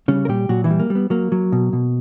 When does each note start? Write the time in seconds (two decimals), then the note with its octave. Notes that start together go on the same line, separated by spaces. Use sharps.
0.08 C#3 G3 C#4
0.25 A#4
0.28 A#2 G3 G4
0.49 A#2 F#3 F#4
0.64 E3 E4
0.70 G3
0.79 A#3
0.90 G3
0.95 B3
1.10 F#3 A#3
1.32 F#3
1.52 B2
1.73 B2